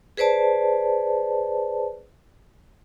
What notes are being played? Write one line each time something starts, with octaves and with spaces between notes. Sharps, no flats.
G#4 B4 C5 D5 A5